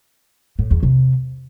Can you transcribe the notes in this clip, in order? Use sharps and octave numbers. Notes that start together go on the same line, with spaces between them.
A2
E2
C3